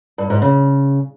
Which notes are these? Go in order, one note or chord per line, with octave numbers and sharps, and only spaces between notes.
G2
G#2
C#3